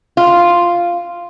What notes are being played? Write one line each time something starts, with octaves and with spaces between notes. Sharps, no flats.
F4